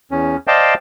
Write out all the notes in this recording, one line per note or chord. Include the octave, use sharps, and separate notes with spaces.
E2 C#4
C5 D5 D#5 F5 G5 A5